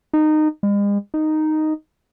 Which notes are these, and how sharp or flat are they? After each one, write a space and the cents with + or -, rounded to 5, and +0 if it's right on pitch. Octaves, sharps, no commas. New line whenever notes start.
D#4 -20
G#3 -45
D#4 -5